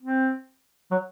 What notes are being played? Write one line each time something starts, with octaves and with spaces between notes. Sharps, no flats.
C4
F#3